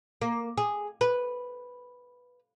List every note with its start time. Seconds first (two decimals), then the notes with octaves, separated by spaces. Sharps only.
0.21 A#3
0.58 G#4
1.01 B4